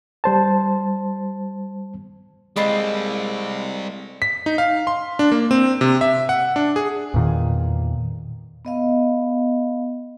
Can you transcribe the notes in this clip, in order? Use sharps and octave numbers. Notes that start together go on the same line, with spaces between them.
G3 C5 A5
G3 G#3 A#3 C4 A4 D#5 B5 C7
B6
D#4
F5
C6
D4
A#3
C4
C3
E5
F#5
D4
G#4
E2 A#2 D#3
B3 D#5 F5